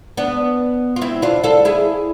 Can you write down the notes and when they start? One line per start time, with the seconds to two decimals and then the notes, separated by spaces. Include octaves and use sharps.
0.17 B3 D4
0.96 F4
1.02 C4 E4
1.22 D4 F4
1.44 F4 A4
1.65 E4 G#4